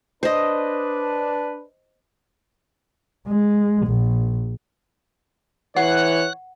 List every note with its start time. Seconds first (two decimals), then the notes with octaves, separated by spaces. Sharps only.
0.23 D4 B4 C5 D#5
3.28 G#3
3.87 A#1
5.77 E3 C#5 F#5 F#6